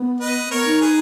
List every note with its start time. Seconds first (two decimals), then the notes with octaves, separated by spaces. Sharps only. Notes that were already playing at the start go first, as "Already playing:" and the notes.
Already playing: B3
0.20 B4 D#5
0.50 B3 A#4 C#5
0.65 D#4
0.81 G#4 B4